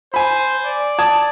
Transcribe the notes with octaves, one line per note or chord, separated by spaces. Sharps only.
C5 G#5 B5
D5
A5 D#6 G#6